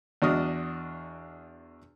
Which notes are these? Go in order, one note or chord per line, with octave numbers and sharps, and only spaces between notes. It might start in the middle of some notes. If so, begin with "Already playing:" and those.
E2 D4 F#4 D#5 D#6 F6